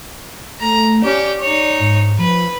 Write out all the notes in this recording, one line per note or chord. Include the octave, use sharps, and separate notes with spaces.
A3 A#5
C#4 G4 D5
D#4 C#5
G#2
F3 B4